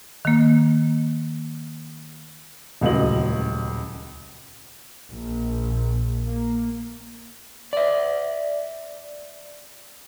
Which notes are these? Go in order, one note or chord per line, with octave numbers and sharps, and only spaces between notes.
D#3 A#3
D#1 C#2 A2 F#3 D#5 F#7
A#1
A#3
D5 E5